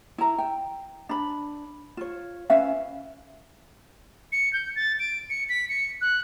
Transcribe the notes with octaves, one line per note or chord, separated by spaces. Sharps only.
E4 A#5
G5
D4 B5
F4 C#5
C#4 B4 E5 F5
C#7
G6
A6
D7
C#7
B6
C#7
F#6